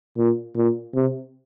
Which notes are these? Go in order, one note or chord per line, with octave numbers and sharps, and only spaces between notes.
A#2
A#2
C3